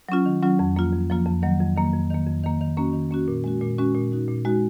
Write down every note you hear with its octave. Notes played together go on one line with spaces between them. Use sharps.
F#3 C#4 F4
D#3
F#3 C#4 F4
F2
F3 A#3 F4
F2
F3 A#3 F4
F2
D#3 F#3 A#3
F2
D#3 F#3 A#3
F2
D#3 A#3
F2
D#3 A#3
D#3
A#3 C#4 F#4
D#3
A#3 C#4 F#4
A#2
G#3 C#4 F#4
A#2
G#3 C#4 F#4
A#2
G#3 D#4 F#4
A#2
G#3 D#4 F#4